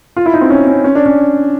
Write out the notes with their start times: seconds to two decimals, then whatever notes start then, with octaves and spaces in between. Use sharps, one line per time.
0.17 F4
0.26 E4
0.34 D#4
0.41 C4
0.50 C#4
0.67 C#4
0.84 C#4
0.95 D4
1.06 C#4